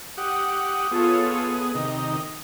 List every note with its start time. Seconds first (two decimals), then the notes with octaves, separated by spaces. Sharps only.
0.18 G4 F#5 D#6
0.91 B3 F4 G#4 A4 C#5
1.75 C3 D#3 D#4